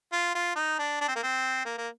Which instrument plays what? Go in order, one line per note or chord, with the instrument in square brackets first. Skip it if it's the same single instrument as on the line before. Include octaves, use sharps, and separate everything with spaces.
[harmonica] F4
F4
D#4
D4
D4
C4
A#3
C4
A#3
A#3